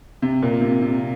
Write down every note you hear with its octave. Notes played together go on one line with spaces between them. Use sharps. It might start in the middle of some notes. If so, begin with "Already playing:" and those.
C3
A#2
C3
C3